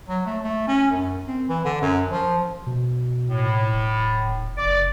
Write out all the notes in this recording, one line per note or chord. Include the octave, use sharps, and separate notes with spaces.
F#3
A3
A3
C#4
F#2
C4
E3
D3
F#2
F3
B2
A2
D1
D#1
F#1 D5